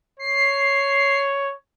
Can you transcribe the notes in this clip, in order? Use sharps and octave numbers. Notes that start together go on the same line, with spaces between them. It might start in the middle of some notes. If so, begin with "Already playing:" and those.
C#5 C7